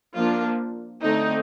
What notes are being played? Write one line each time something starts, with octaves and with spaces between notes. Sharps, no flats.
F3 A#3 D4 F4
D3 A3 C4 D#4